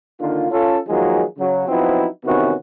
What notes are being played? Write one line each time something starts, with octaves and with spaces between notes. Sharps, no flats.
D3 D#3 A#3 F4
C#4 F4 A4
D#3 F3 F#3 G#3 A#3 G#4
C#3 F#3
F3 F#3 B3 C4 D#4 E4
C3 D#3 E3 B3 C#4 F#4